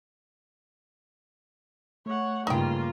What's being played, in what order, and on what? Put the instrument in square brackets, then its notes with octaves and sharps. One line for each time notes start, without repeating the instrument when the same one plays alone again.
[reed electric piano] A3 [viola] C#5 F#5
[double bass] G2 C#3 [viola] A#3 F4 [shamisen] D#4 G5